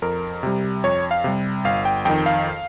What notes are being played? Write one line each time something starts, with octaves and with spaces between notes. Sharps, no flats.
F2 A#4
C3 G3
F2 C#5
F5
C3 G3
G1 F5
G5
F2 D#3 G5
F5